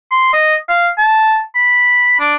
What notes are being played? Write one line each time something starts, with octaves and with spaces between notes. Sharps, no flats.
C6
D#5
F5
A5
B5
D4